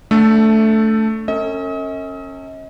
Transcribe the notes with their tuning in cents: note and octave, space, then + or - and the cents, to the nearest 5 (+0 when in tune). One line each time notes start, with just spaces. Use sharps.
A3 +0 D4 -20 A4 +0
C#4 -20 A4 +45 D#5 +40